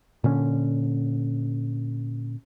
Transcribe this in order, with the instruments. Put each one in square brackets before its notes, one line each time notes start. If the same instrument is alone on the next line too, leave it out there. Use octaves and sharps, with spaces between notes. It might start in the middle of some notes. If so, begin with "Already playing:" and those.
[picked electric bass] A#2 D3 C#4